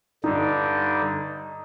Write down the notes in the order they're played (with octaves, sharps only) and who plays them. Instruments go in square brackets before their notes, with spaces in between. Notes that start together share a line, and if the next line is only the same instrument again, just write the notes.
[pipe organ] G2 D3 G3 [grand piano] D#4